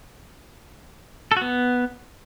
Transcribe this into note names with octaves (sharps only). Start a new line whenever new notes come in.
A4
F#4
B3